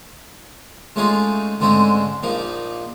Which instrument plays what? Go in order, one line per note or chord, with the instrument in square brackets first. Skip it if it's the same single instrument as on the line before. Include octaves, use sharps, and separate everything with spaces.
[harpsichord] G#3 A3 C#4 D#4 F4 G#4
G#2 D3 G#3 A3 C4 C#4
A#1 F3 A#3 D#4